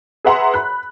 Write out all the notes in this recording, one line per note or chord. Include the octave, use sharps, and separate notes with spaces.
G#4 B4 E5 F#5 A#5 C6
B5 F#6